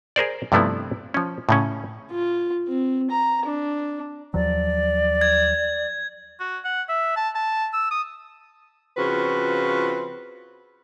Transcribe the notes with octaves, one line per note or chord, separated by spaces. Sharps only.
G#4 A#4 C5 D5
G2 C3 F3 A3 B3 E4
F3 C#4
A2 C#3 C#4
F4
C4
A#5
D4
D#2 F3 F#3 D5
G#6
F#4
F#5
E5
A5
A5
E6
D#6
C#3 F3 C4 F4 F#4 B4